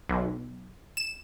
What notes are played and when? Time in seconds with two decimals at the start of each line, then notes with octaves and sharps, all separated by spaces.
0.09 B1
0.97 E7